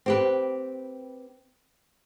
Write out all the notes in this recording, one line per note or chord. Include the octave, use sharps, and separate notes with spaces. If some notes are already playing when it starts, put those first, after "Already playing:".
C4 G4 B4